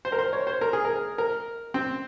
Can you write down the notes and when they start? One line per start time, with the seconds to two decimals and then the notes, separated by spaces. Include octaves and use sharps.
0.05 C5
0.12 A#4
0.18 C5
0.33 C#5
0.47 C5
0.61 A#4
0.73 G#4
0.85 A#4
1.18 A#4
1.74 C4